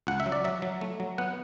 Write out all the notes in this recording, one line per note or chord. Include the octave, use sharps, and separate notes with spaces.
C#2 F#5
E5
F#3
D5
F#3 E5
F#3
A3
F#3
B3 F#5